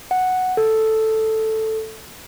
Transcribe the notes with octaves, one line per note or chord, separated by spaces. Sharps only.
F#5
A4